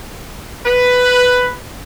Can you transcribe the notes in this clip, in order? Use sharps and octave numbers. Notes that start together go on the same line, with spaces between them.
B4